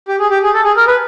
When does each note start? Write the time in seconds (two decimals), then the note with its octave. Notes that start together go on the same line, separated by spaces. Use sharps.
0.08 G4
0.19 G#4
0.31 G4
0.43 G#4
0.54 A4
0.64 G#4
0.76 A#4
0.88 B4